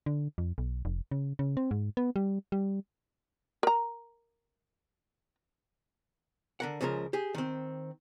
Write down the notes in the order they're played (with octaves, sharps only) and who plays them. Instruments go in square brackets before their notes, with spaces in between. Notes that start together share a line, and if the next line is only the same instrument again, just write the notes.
[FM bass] D3
F2
B1
F1
C#3
C#3
C4
G#2
B3
G3
G3
[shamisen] A#4 A#5
[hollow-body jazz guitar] D3 A#4 F#5
C#2 C#3 F3 A4 A#4
G4 G#4
D#3 C4